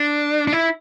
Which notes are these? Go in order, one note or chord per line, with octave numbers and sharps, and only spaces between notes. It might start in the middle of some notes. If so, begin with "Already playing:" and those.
Already playing: D4
D4
E4